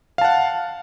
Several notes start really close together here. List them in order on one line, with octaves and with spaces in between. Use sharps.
F5 A5 F#5